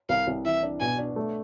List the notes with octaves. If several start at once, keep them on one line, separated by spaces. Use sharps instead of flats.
C2 F5
C2
E3 E5
D4
B2 G#5
D4
A3